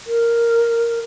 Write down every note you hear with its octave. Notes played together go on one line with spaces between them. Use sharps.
A#4